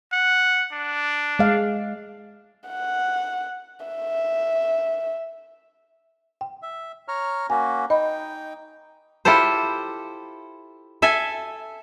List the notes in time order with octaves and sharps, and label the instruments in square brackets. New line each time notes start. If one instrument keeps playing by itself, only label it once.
[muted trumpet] F#5
D4
[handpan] G#3 F5
[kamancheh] F#5
E5
[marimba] G5
[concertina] E5
C#5 A#5 F6
[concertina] A#3 C#4 F#4 [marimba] G#5
[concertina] D#4 G5 [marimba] D#5 B5
[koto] E4 F4 G4 A4 C5
A4 E5 G#5